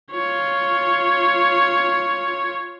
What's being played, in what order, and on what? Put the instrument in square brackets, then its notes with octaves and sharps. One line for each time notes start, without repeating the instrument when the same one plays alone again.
[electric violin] F4 C#5